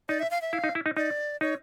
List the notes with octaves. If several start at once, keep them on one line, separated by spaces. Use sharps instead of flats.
D#4 D5
E5
F5
E5
E4 F5
D#4
E4
D#4
D#4 D5
D#4 C#5